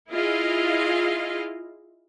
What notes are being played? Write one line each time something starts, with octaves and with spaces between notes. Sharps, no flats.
E4 F4 G#4 D#5 F5